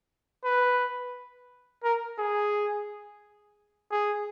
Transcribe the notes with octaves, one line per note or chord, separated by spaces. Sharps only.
B4
A#4
G#4
G#4